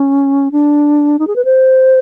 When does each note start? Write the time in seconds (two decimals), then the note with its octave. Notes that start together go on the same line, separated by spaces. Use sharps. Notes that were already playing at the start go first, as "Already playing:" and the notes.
Already playing: C#4
0.52 D4
1.19 D#4
1.27 G#4
1.36 B4
1.45 C5